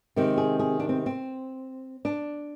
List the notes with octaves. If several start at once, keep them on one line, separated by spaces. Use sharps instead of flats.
C3 D#3 G#3 C4 G4
G#4
G#4
D4
C4
C4
D4